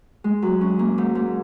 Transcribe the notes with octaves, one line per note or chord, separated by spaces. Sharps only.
G#3
F#2
C#4
A#3
G#2
G#2